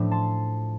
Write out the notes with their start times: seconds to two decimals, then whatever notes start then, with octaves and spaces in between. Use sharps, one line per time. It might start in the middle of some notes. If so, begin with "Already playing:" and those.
Already playing: A2 F3 A3 D4
0.11 A5 C6